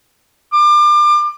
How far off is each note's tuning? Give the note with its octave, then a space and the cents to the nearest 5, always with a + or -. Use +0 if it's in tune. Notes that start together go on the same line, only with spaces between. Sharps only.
D6 +30